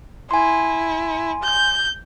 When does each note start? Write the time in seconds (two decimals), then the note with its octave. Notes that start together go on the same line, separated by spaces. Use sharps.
0.31 E4 G#5 C6
1.43 G6